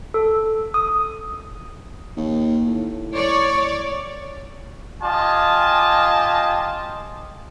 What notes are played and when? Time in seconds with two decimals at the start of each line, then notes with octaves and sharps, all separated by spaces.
0.14 A4
0.74 D#6
2.16 D#2
2.67 A2
3.14 C#5 D5
5.02 F4 G4 D#5 G#5 A5